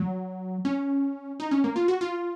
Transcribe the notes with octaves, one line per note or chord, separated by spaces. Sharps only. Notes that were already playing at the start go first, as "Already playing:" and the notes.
Already playing: F#3
C#4
D#4
C#4
A#3
F4
F#4
F4